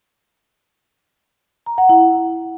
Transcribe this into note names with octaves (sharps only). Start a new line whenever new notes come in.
A#5
F#5
E4